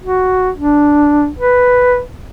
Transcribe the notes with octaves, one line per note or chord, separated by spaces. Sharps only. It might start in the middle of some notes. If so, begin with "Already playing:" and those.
F#4
D4
B4